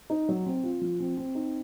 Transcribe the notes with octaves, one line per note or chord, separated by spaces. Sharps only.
D#4
F#3
C4
F4
F3
C4
C4
D#4